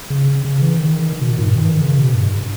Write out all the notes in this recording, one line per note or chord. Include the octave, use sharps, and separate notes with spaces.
C#3
C#3
E3
D#3
D#3
B2
A#2
G#2
G2
D#3
E3
D#3
C#3
B2
G2